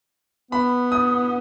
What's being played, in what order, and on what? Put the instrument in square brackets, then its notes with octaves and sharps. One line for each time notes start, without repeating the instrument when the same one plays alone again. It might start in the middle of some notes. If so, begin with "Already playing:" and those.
[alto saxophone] B3 [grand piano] B5
[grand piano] D#6